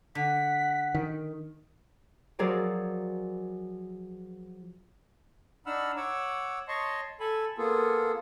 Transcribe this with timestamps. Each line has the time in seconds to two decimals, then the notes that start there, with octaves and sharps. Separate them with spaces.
0.15 D3 F#5 B6
0.95 D#3
2.39 F3 F#3 G#4 A#4 D5
5.66 D4 D#4 F#5 B5 E6 F6
5.97 C#5 F#5 D6 E6
6.68 C#5 D#5 A5 C6 C#6
7.20 A4 G#5 A5 B5
7.58 A#3 B3 F4 G#4 A4